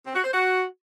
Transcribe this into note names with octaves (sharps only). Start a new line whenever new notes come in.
C4
F#4
C5
F#4